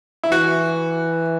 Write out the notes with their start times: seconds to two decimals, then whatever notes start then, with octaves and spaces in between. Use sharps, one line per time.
0.23 E4
0.31 E3 F#4